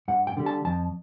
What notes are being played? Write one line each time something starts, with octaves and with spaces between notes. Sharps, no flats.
G2 F#5
G5
D3 G3
A5
F2 A5